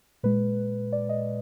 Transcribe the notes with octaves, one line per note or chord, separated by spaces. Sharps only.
A#2 G#3 B4
D5
D#5